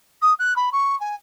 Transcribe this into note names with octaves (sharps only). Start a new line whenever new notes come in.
D#6
F#6
B5
C#6
G#5